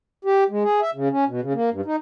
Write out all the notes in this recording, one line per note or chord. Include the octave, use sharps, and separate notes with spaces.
G4
G#3
G#4
E5
C#3
C#4
B2
C#3
A#3
G2
D#4